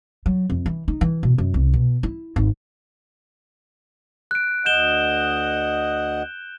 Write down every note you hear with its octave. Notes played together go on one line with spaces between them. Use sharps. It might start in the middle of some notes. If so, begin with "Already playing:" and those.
F#3
F2
E3
D#4
E3
B2
F#2
C2
B2
E4
G#1
F#6 D7
D2 D#5 F#5 G6 E7 G7